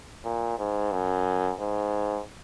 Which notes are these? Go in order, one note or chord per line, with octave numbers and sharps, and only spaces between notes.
A#2
G#2
F#2
G#2